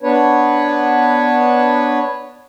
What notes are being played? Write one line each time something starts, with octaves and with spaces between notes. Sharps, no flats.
B3 D4 B4 C#5